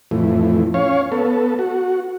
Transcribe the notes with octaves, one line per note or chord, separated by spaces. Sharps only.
F2 A2 E3
C#4 C#5 F5
B3 A4
F#4